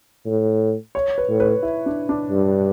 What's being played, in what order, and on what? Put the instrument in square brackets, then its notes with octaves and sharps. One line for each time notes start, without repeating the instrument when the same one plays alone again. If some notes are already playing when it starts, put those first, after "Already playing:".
[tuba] A2
[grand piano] C#5
B4
[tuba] A2
[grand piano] B4
E4
D4
D4
[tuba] G2